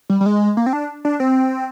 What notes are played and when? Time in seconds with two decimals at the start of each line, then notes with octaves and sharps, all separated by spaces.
0.10 G3
0.21 G3
0.26 G#3
0.57 A#3
0.66 C4
0.73 D4
1.05 D4
1.20 C4